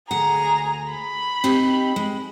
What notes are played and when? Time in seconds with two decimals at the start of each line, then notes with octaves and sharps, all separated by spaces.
0.11 D2 G#4 F#5 A#5
0.92 B5
1.44 C4 D#4 G4
1.96 G#3